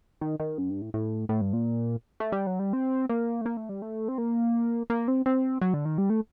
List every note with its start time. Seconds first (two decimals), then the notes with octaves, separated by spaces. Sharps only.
0.21 D#3
0.40 D#3
0.58 F#2
0.70 G2
0.82 A2
0.94 A2
1.29 A2
1.41 G2
1.53 A#2
2.20 A3
2.32 G3
2.47 F#3
2.59 G3
2.73 C4
3.09 A#3
3.41 A3
3.46 A#3
3.57 A3
3.69 G3
3.82 A3
4.08 C4
4.18 A#3
4.90 A#3
5.08 C4
5.26 C4
5.61 F#3
5.74 D3
5.85 D#3
5.98 G3
6.10 A3